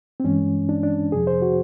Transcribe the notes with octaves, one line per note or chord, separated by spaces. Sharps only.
C4
G2 E3 G#3 C#4
D4
D4
F2 C3 F3 G#4
C5
F#4